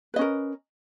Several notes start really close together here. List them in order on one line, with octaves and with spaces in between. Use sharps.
B4 D#5 C#4 A#4